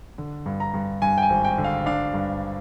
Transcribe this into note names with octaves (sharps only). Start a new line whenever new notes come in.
D3
G2
A#5
G2
G2 G#5
G5
G#5
G#1
G5
D3
F5
D4 F5
G2